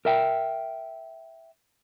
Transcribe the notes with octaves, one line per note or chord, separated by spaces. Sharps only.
A#4 E5 G5